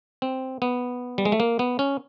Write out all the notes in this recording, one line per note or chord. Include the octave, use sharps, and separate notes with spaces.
C4
B3
G3
G#3
A3
A#3
B3
C#4